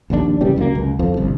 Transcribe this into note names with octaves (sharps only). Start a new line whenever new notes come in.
A#1 D#2 C#3 D4
A#2 C#3 E3 G3
C#2 F#2 F#3 A#3
C#2
F2 F3
G1 C2